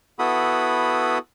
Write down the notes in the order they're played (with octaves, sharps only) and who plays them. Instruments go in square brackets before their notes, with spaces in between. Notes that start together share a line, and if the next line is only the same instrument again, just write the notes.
[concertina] B3 E4 F#4 A4 B5 D#6